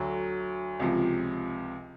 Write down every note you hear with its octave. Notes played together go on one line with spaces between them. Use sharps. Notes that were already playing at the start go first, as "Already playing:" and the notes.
Already playing: D2 D3 F#3
C#2 C3 F3